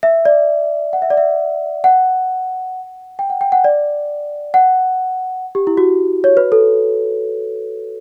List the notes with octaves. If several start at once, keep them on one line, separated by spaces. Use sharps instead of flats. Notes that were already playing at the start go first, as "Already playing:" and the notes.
E5
D5
F#5
E5
D5
E5
F#5
G5
F#5
G5
F#5
D5
F#5
G4
E4
F#4
C#5
B4
A4